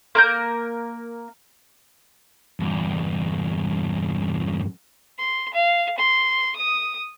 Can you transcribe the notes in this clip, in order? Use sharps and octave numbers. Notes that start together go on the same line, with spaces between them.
A#3 A#4 G6
E2 G2
C6
F5
C6
D#6